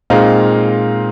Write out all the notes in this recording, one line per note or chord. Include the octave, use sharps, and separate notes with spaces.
A#2 G#3 C4 D#4 F5